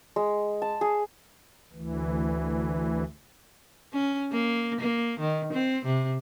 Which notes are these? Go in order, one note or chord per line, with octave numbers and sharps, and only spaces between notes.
G#3
A5
G#4
D2 E3
C#4
A#3
A#3
D#3
C4
C3